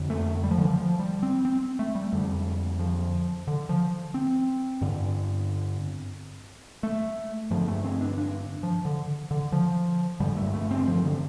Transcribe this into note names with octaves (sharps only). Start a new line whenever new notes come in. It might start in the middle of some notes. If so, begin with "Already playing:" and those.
Already playing: F2 D3
A3
G3
F3
D3
F3
F3
G3
C4
C4
A3
G3
F2 D3
F3
D3
F3
C4
G2 D3
A3
G2 D3 F3
A3
C4
D4
D4
F3
D3
D3
F3
G2 D3 G3
A3
A3
C4
F3
D3